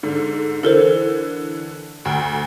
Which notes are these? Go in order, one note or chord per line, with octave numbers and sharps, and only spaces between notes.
G#2 D3
D3 E3 A4 A#4 C5
D2